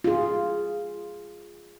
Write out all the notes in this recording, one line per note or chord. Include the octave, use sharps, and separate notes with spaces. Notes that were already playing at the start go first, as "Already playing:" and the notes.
F4 G#4